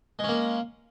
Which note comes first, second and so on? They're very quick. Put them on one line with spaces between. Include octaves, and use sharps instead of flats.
G#3 C#4 A#3